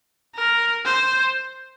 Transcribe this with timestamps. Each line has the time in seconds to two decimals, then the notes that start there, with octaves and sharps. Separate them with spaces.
0.35 A#4
0.85 C5